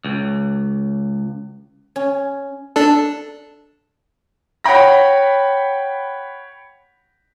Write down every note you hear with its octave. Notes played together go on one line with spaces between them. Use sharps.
C#2
C#4
D4 A4
C#5 F#5 G5 B5 A#6